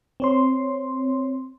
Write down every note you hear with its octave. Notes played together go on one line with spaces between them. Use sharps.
C4 C#5 C6